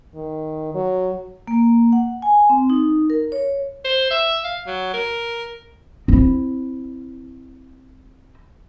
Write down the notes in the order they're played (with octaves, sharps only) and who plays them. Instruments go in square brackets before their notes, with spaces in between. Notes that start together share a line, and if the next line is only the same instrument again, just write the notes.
[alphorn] D#3
F#3
[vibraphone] A#3
F#5
G#5
C4
D#4
A#4
C#5
[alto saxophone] C5
E5
F5
F#3
A#4
[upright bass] C4 E4